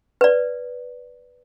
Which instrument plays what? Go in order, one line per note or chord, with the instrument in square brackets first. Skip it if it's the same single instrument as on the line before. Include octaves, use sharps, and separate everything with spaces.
[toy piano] B4 D5